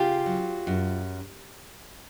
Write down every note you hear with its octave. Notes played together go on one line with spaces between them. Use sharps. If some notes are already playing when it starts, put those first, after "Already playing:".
Already playing: C#3 F4 G4
F#3
F#2